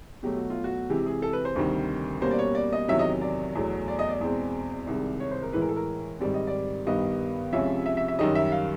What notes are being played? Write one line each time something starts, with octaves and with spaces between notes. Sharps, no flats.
B2 F#3 A3 G4
F#4
F4
F#4
C3 E3 G#3 G4
G#4
A4
B4
C5
D2 C3 D#3 G3
B2 G3 A#3 C#4 C5
D5
C#5
D5
D#5
E2 C3 D#3 F#3 E5
D#5
D5
E2 B2 F#3 A3
D5
D#5
D5
E2 B2 G#3 C4
C2 C3 D#3 G#3
C#5
C5
A#4
A2 E3 G#3 B4
A#4
A4
A#4
G#2 D#3 G3 C4 D5
D#5
D5
G2 D#3 G3 B3 D#5
C#2 C3 F3 G#3 C#4 E5
E5
E5
E5
F#2 D#3 G3 D#5
E5
F5